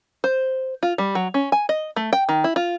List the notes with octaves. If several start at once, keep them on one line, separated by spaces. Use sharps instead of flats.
C5
F4
G3
F#3
C#4
G#5
D#5
A3
G5
D#3
E4
F4